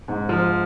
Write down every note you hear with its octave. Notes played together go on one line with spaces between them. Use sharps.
G#2
F3